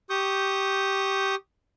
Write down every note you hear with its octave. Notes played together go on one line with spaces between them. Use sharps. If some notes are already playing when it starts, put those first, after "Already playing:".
G4 C#6 D#6 G6